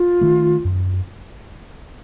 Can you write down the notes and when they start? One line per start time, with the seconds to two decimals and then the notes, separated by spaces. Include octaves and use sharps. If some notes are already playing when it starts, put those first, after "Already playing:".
Already playing: F4
0.21 D#3 A3
0.65 F#2